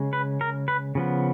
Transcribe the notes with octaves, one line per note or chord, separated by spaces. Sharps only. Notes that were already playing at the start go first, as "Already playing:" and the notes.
Already playing: C#3 G#3 C#4
B4
A#4
B4
C#3 F3 B3